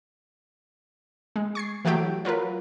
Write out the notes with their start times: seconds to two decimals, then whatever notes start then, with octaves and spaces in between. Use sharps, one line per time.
1.36 G#3
1.55 C#6 G#6 C7
1.85 E3 F#3 A3 G4 D7
2.25 F#3 F4 A#4 B4